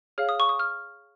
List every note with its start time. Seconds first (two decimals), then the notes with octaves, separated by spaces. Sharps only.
0.18 G#4 C#5 F5 F6
0.29 D#6
0.40 C#6
0.49 D#6
0.59 F6